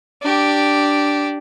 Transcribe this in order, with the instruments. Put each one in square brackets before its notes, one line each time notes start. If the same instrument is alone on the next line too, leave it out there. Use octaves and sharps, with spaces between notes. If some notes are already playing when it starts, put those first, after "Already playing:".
[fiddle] D4 G4